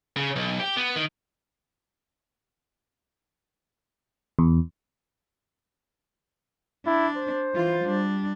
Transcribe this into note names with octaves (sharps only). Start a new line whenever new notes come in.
C#3
B1
G4
B3
D#3
E2
D4 E4
C5
E3 F4
G3 D4